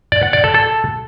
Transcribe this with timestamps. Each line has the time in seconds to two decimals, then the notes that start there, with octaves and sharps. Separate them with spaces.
0.12 D5
0.23 F#5
0.33 D5
0.44 A4
0.54 A4